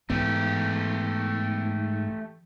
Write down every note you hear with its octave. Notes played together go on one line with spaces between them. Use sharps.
G#2 E3 A3 B3 G4